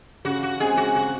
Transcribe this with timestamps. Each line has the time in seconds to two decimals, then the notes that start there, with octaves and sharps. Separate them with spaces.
0.25 C#3 F#4
0.43 F#4
0.60 G#3 C4 G#4
0.77 F#4
0.95 C#3 F#4